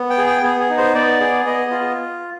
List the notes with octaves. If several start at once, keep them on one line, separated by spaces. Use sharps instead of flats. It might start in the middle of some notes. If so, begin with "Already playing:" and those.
Already playing: B3
G5
G#4
G5
B3 G#4
G#4
D#4
C5
B3 D5
G#4
B3 D#5
F4